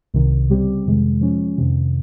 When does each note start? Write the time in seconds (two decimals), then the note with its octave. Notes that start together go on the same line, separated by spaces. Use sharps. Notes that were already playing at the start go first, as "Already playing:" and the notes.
0.14 C2 C3 D#3
0.50 C#3 G3 C4 G4
0.85 F2 C3 D#3 G#3
1.21 F3 G#3 C#4
1.57 F2 C3 D#3